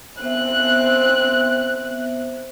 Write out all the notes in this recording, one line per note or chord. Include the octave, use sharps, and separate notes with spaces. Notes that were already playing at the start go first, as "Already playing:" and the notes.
B3 C4 C5 E5 F#6